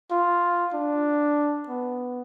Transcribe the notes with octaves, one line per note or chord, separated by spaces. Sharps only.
F4
D4
B3